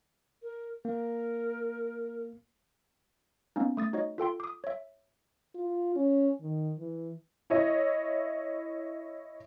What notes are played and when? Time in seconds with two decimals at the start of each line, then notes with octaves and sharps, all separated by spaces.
0.43 A#4
0.85 A#3 A#4
3.56 A#3 B3 C#4 D#4
3.77 A3 D#6 A6
3.93 D#4 F#4 C#5 D#5
4.18 F4 A4 G5 C6
4.40 D6 D#6
4.64 C#5 E5
5.55 F4
5.96 C#4
6.41 D#3
6.79 E3
7.50 E4 C#5 D#5